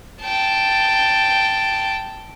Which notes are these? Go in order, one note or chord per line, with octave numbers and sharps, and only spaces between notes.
G5 A5